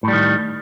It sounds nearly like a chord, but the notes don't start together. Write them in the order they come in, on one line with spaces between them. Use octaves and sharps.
A2 G3 D#3